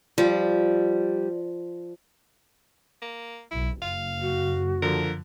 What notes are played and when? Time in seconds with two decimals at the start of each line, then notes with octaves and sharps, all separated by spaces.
0.18 F3 G3
3.02 A#3
3.51 B1 E4
3.82 F#1 F5
4.21 F#4
4.82 D3 F3 A#4